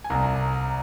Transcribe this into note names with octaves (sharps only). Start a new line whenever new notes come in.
G#5
C2 A#5